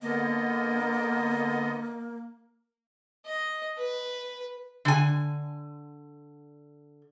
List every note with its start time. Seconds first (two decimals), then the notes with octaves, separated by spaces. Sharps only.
0.02 D3 A#3 B3 D#5
3.25 D#5
3.78 B4
4.85 D3 G#5